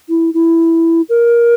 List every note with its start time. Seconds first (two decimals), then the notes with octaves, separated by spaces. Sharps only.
0.09 E4
0.34 E4
1.09 A#4